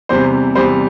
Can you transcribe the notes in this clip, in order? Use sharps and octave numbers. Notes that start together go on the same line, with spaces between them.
E2 C3 G3 C5
E2 C3 G3 C5